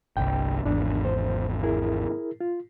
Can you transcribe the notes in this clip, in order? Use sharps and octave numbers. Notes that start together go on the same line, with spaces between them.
G1 C2 G5
G#1 E2 D4
C5
E4 G#4 A#4
F4